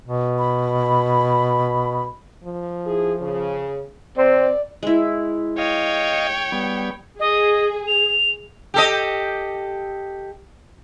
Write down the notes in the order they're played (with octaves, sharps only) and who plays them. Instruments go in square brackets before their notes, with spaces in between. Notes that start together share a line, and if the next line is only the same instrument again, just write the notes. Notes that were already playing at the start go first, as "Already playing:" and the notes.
[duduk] B2
[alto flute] B5
[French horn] F3
[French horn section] E4 G#4
C#3
[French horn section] C3 [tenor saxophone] C4 [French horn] D5
[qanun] G#3 E4
[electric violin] C#5 G5 [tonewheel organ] D#5 F5
[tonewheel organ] G3 B3
[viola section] G#4 [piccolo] D#5
[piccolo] F7
[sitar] G4 A4 D#5